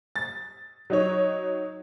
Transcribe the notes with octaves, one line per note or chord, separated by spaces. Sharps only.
A6
F#3 D#4 C#5